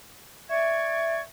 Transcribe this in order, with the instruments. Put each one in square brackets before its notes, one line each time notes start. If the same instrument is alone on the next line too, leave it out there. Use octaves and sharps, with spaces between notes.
[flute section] D5 C#6 G#6 [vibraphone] E5